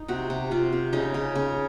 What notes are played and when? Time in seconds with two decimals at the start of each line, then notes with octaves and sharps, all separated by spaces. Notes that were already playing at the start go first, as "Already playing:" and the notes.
Already playing: D#4
0.08 C3 F#4
0.30 C3
0.51 C3 F4
0.73 C3
0.93 C#3 D#4
1.14 C#3
1.35 C#3